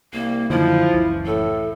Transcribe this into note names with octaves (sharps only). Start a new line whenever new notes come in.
C2 A#3
F#2 D3 D#3 F3 E4
F#1 C#2 E3
A2 A4